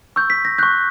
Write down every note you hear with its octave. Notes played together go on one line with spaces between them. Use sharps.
C#6 E6 G6
B6
A#6
C#6 F#6 G6